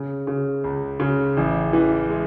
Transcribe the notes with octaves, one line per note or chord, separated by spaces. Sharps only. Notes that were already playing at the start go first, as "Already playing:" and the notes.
Already playing: C#3
C#3
C#2
C#3
A1
E3
G#3